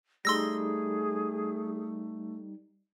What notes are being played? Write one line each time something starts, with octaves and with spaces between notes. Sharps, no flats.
G3 A3 D#4 G#4 C6 E6 A#6